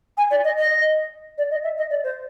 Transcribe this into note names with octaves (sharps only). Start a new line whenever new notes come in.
G#5
D5
D#5
D#5
D5
D#5
E5
D#5
D5
C5